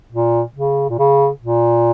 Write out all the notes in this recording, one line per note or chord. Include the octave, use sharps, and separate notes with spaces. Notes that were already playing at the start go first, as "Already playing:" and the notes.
A#2
C#3
A#2
C#3
A#2